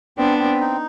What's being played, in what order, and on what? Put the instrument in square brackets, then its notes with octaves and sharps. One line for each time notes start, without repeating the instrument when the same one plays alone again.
[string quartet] B3 D4 [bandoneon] C4
[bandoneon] C4
D#4